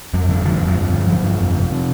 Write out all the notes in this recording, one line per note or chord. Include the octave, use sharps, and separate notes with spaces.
F2 F#3
D3 F#3
D3 F3
F2 F#3
F3
G2
D3
D3 F#3
G2 F3
F2
C3
C3